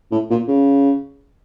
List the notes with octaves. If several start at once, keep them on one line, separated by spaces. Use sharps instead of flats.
A2
A#2
C#3